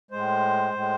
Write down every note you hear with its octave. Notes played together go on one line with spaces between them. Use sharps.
A2 G#3 C5
A2 G#3